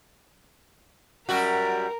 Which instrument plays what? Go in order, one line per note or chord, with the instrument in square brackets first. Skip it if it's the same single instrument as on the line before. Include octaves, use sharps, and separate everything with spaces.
[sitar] F#2 G3 F#4 [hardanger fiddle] A#4